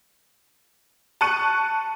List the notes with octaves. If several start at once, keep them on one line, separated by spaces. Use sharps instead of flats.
A5 C#6 F#6 C#7 D#7